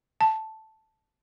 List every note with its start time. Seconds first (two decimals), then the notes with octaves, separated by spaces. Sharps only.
0.21 A5